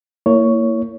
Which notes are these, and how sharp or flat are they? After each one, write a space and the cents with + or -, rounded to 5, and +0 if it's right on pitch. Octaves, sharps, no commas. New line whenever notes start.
A#3 -20 E4 +0 C#5 +10